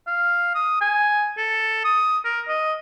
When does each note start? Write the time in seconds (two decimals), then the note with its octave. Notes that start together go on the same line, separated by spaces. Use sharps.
0.07 F5
0.55 D#6
0.81 G#5
1.37 A4
1.85 D#6
2.25 A#4
2.48 D#5